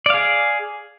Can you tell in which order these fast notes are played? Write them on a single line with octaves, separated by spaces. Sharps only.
D5 F5 G#4